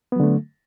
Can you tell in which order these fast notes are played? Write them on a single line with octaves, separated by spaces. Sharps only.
B3 F#3 D3 A3